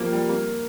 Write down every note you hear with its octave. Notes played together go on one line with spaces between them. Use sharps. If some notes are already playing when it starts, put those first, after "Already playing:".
Already playing: F3 G3 A#3
G3
A#3